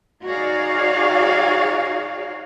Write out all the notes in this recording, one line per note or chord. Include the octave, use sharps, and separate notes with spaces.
D#4 F#4 G#4 C#5 D5 F5